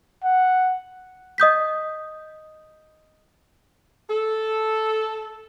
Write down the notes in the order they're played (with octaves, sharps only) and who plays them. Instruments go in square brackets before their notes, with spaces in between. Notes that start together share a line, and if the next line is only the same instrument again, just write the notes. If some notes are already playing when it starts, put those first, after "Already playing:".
[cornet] F#5
[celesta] D#5 D#6 G6 B6
[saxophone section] A4